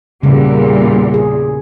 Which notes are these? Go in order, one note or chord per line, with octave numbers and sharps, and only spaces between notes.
E2 A#2 C#3 G3
G#4